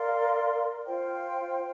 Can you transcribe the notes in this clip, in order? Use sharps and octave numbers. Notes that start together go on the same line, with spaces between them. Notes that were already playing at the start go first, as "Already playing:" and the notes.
Already playing: A#4 D5 F5 C6
F4 C5 G5